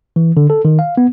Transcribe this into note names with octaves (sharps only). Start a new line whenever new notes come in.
E3
D3
A4
D#3
F5
B3